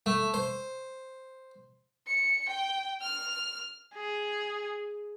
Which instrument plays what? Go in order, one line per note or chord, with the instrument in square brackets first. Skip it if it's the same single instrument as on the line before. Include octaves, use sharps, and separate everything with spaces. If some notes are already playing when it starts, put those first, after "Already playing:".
[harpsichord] A3
C5
[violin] C#7
G5
F6
[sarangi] G#4